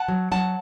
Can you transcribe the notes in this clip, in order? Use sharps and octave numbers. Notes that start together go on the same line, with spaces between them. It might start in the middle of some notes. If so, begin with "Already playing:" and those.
Already playing: F#5 A5
F#3
F#3 F#5 A5